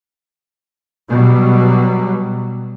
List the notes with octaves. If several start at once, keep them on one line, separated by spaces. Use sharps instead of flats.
B2 F#3 G3